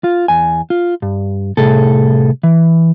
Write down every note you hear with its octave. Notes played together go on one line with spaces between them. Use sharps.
F4
E2 G#5
F4
G2
C2 A2 C3 G#4 A4
E3